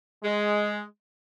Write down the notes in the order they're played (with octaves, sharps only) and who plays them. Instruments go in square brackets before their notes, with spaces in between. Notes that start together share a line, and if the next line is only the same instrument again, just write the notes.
[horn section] G#3